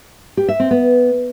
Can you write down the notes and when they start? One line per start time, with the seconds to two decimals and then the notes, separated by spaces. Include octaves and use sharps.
0.37 G4
0.49 E5
0.60 C4
0.71 B3